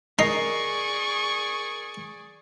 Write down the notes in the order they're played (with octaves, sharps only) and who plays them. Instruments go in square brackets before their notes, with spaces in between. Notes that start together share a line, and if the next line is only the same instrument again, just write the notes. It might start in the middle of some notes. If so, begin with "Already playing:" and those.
[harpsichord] D#4 [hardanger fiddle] G#4 D5 [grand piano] A#4 A#6 C7 [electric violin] C#6